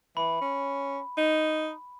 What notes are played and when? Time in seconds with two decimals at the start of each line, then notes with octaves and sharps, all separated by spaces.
0.17 E3 B5
0.41 C#4
1.18 D#4